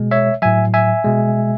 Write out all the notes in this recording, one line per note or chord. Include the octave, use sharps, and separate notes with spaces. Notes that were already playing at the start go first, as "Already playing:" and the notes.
Already playing: B2 G#3
C#5 E5
A2 F#3 E5 G#5
E5 G#5
B2 G#3